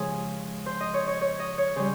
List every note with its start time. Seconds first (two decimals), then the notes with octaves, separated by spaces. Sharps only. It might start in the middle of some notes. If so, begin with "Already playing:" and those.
Already playing: C#3 F3 G#3 G#4
0.66 C5
0.81 D#5
0.94 C#5
1.08 C#5
1.21 C#5
1.39 D#5
1.58 C#5
1.76 C#3 G3 C5